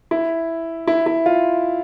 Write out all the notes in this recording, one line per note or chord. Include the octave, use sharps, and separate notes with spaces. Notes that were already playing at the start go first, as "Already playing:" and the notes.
E4
E4
E4
F4